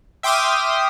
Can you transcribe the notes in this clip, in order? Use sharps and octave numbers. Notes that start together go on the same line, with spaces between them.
E5 G5 C6 D6 D#6 F6